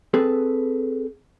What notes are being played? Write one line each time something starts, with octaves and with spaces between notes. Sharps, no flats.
C4 G#4 A4 B4